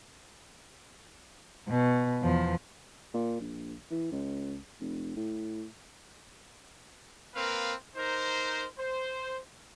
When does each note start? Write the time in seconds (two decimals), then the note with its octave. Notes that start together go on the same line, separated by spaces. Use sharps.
1.69 B2
2.22 E2 F3
3.14 A#2
3.40 A#1
3.91 E3
4.12 C#2
4.81 F1
5.16 A2
7.35 A#3 C4 A#4 B4 F5
7.96 D#4 A#4 C5
8.79 C5